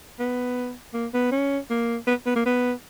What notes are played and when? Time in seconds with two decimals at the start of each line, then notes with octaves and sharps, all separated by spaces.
0.19 B3
0.94 A#3
1.14 B3
1.32 C#4
1.70 A#3
2.07 B3
2.26 B3
2.36 A#3
2.46 B3